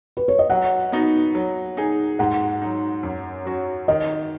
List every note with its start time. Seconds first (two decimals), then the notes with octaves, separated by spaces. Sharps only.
0.17 B4
0.28 C#5
0.39 D#5
0.50 F#3 F#5
0.92 B3 D#4 F#4
1.35 F#3
1.77 D#4 G#4
2.19 G#2 F#5
2.62 F#3 D#4
3.03 F#2
3.45 F#3 C#4 F#4
3.88 D#3 D#5